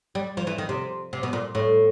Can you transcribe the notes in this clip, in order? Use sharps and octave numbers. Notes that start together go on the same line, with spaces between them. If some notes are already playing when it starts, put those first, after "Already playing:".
G3
F3
E3
D#3
C3
C3
B2
A#2
A2